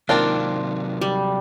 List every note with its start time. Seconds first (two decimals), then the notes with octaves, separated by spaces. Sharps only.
0.09 C3 D#3 F#3 A#3 C4 D4 F4
1.01 G3